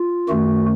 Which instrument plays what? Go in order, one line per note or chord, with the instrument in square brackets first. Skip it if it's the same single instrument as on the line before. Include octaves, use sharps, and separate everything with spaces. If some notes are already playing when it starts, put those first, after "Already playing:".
Already playing: [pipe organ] F4
F#2 D#3 A3 F#4